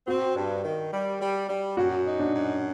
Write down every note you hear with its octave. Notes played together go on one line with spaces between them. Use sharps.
C4 F#4
G2
D#3
G3
G3
G3
F#2 F#4
D#4
D4
F#2